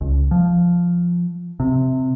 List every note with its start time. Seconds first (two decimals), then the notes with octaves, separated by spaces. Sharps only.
0.01 C#2
0.31 F3
1.60 C3